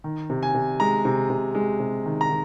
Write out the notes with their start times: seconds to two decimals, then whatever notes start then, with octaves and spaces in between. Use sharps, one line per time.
0.04 D#3
0.30 C3
0.43 G#5
0.54 C3
0.80 G#3 A#5
1.05 C3
1.30 C3
1.55 G#3
1.80 C3
2.06 D#3
2.21 A#5
2.30 D#3